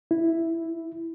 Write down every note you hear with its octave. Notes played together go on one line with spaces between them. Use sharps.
E4